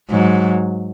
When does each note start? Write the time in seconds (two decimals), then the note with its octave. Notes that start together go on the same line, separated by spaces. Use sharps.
0.10 G#2 F#3